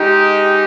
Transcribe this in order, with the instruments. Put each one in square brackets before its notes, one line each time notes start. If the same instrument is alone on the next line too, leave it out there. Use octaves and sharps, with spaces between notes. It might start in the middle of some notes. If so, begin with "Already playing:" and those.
Already playing: [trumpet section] G#3 D#4 G4